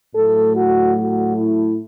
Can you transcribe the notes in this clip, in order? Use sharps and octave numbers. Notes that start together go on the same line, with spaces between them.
A2 F#3 A3 A4
F#4
F#4
E4